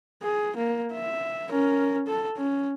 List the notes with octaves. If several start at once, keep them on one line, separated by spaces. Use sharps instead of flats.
G#4
A#3
E5
C#4 A#4
A4
C#4